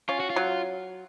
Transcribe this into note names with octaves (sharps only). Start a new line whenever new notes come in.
C#4 F4
F#4
F4
F#3